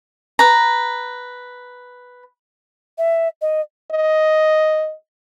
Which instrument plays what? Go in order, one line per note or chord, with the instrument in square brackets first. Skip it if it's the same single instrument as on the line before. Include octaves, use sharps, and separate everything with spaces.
[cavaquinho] B4 A#5
[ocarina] E5
D#5
[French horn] D#5